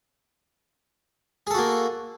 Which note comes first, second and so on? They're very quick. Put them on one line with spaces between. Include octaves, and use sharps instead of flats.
G#4 A4 F#4 A#3